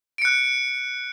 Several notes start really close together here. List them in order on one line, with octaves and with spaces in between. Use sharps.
D7 C#7 F#6